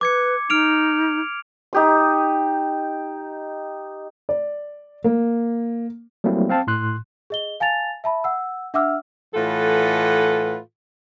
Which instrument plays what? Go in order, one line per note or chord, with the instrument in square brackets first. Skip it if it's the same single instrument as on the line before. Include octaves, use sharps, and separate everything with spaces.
[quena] B4 [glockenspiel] D6 G#6 C#7
[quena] D#4 [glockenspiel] F6 D7 F7
[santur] D#4 G4 D#6
[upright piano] D5
A#3
[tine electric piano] F#3 G3 A3 A#3 C4 E4
C4 F5 A5
A2 C6 F#6
[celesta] G#4 D#5 G7
F5 G#5 A5 A6 F7
E5 A5 B5
F#5 E6
D4 E5 F#5 D6 E6 F6
[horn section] A2 E3 F4 A4 B4 F#5